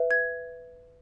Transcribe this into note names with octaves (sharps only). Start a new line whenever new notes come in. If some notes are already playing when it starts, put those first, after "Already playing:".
Already playing: B4 E5
G#6